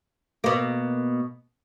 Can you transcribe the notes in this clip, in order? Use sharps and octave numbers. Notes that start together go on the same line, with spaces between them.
B2 A#3